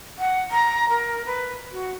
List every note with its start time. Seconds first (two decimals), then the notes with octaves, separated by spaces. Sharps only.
0.18 F#5
0.51 A#5
0.89 A#4
1.26 B4
1.71 F#4